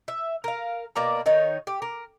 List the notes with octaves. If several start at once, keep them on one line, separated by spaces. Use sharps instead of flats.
E5
A#4 F5
B2 A#3 D5 A#5
D#3 D#4 C#5
G4
A#4